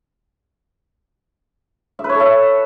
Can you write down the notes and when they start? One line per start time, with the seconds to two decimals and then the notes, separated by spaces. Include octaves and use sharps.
1.99 E5
2.04 B4
2.09 C#5
2.15 A4
2.20 E5